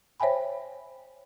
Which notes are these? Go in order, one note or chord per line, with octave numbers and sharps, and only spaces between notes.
C5 C#5 E5 G5 G#5 B5